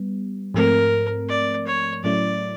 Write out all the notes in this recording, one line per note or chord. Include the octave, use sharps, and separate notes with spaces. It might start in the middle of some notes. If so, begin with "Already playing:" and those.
Already playing: G3 B3
G#2 F3 A3 C4 A#4
D5
C#5
A2 F#3 A3 C#4 E4 D5